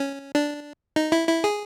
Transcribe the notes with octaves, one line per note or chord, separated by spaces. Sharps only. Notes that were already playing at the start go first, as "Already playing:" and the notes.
Already playing: C#4
D4
D#4
E4
E4
G#4